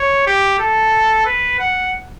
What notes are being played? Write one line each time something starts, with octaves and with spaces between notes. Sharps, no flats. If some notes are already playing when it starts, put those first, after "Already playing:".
Already playing: C#5
G4
A4
B4
F#5